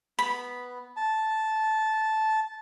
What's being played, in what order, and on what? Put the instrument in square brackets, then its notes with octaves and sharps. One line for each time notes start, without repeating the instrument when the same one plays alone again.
[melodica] B3 [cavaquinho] B5
[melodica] A5